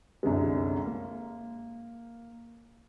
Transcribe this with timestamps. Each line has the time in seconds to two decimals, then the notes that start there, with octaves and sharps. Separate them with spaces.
0.23 C2 F#2 D3 G#3
0.85 A#3